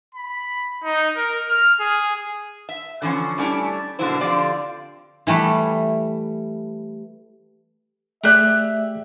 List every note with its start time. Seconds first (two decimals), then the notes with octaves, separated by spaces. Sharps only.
0.15 B5
0.84 D#4
1.16 A#4
1.49 F6
1.80 G#4
2.69 E5
3.02 D3 E3 F3 A#3 C#4
3.38 G3 A3 C#4 D4 E4 G4
3.99 B2 D3 F#3 A#3 E4 C5
4.21 D3 F3 C4 F4 G4 D5
5.27 E3 G3 A3
8.24 A3 G4 G#4 D5 E5 F#6